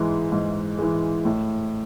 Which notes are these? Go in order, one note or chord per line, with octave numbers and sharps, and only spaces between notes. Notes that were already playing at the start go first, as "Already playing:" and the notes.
Already playing: G#2 E3 G#3
G#2
E3 G#3
A2